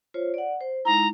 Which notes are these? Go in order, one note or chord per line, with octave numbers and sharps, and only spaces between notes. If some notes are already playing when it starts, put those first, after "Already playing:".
F4 C5 C#5
D5 F#5
C5
G#3 D#4 E4 A#5